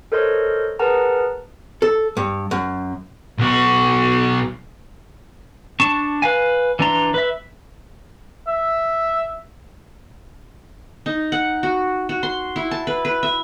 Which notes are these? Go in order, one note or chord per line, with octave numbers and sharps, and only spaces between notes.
A4 A#4 C5 C#5 D#5 C6
G#4 A#4 B4 F#5 A5 A#5
A4
G2
F#2
B1 F#4
D4 A5 C#6
B4 F5 G#5
E3 D4 A#5 C6
B4 E5
E5
D#4
F#5
F#4
F#4
C6
E4
A5
B4
B4
E5